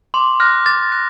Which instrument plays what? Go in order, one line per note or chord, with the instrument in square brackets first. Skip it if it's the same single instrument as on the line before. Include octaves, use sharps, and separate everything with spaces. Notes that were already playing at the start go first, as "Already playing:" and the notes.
[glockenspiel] C6 [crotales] D6
[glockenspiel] F6 [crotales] F#6 A#6
[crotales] D6 [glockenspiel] A6
[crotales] F#6 A#6